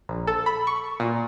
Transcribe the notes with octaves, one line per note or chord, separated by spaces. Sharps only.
A#1
A4
B5
C#6
A#2